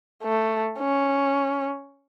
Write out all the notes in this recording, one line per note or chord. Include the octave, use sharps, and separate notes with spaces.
A3
C#4